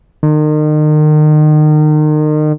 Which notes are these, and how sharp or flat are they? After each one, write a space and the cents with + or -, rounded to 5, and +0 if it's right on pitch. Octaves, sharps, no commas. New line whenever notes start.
D#3 -35